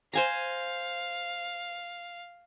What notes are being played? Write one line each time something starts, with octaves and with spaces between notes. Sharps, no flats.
C5 F5 G#5 A#5